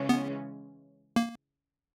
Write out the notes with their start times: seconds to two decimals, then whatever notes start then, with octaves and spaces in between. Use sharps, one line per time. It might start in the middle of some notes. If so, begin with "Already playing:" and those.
Already playing: C#3 E3 G#3 C#4
0.09 B3
1.16 A#3